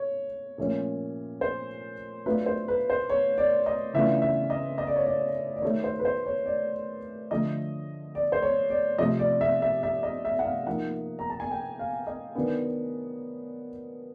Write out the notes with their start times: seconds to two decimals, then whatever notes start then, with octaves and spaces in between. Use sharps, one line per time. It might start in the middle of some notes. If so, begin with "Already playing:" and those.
Already playing: C#5
0.58 A#2 F3 A3 C#4 F4
1.41 C5
2.26 F#3 A3 D4 F4 B4
2.46 C5
2.68 B4
2.90 C5
3.09 C#5
3.38 D5
3.66 D#5
3.94 C#3 E3 A3 D4 F4 E5
4.22 E5
4.50 D#5
4.78 D#5
4.87 D5
4.96 C#5
5.05 D5
5.56 D5
5.62 D#3 F#3 A3 C#5
5.84 C5
5.99 B4
6.05 C5
6.26 C#5
6.46 D5
7.31 D3 F3 A3 D#5
8.15 D5
8.32 C5
8.42 C#5
8.70 D5
8.98 C3 F3 A3 D#5
9.19 D5
9.41 E5
9.62 E5
9.83 E5
10.03 D#5
10.25 E5
10.39 F#5
10.45 F5
10.67 F3 A#3 D#4 F#5
11.19 A#5
11.30 A5
11.40 G#5
11.51 G5
11.79 F5
12.07 D#5
12.34 D#3 F#3 B3 D4